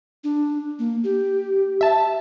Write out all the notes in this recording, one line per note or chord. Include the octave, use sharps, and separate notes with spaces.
D4
A#3
G4
E5 A5